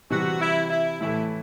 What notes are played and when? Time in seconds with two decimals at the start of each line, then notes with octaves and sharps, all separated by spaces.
0.10 C3 E3 G3 F#4
0.41 E4
0.70 E4
1.01 A2 E3 A3 E4